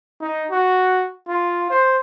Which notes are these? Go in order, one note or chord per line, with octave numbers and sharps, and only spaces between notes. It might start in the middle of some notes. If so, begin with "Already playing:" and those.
D#4
F#4
F4
C5